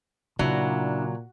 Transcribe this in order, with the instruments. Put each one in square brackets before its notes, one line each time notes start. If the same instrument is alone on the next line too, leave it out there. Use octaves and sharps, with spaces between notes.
[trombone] A#2 [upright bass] C#3 [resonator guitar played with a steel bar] F#3 [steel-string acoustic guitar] D4 E4